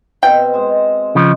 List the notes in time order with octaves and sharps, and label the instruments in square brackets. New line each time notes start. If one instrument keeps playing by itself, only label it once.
[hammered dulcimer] B2 C4 [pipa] G5
[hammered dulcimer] G#3 C5
[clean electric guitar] C#3 F3